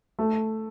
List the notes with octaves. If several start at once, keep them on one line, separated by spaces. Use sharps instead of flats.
A3